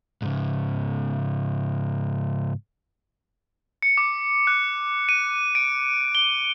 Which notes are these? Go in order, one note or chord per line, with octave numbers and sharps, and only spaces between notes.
G#2 C#3
C#7
D6
F#6
D#7
D7
G7